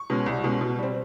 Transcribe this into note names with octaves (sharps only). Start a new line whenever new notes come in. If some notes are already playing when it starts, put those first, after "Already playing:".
Already playing: C#6
B2 G#3 C#4
C2
B2 G#3 C#4
B2
G3 C4